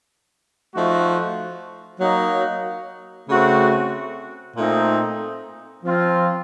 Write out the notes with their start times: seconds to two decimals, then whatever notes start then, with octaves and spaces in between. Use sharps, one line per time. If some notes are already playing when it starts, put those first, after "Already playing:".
0.73 F3 A3 D#4 F#4
2.00 F#3 A#3 D#4
3.29 C#3 A3 C4 F#4
4.56 A#2 A3 C4 D#4
5.84 F3 C4 F4